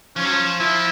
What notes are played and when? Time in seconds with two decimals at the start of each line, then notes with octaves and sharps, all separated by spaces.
0.16 F3 C#4
0.24 F#3
0.32 F3
0.60 F3 E4